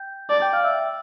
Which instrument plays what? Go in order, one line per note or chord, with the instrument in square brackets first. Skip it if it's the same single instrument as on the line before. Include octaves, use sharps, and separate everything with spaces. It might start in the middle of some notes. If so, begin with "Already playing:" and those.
Already playing: [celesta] G5 G6
[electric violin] D5 [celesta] A5 A6
[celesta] G5 G6
F5 F6
E5 E6